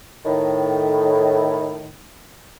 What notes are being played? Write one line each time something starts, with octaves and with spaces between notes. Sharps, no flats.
A2 D#3